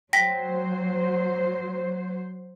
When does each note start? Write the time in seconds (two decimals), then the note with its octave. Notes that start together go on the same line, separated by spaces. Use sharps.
0.13 F#3 C5 G5 A#6 B6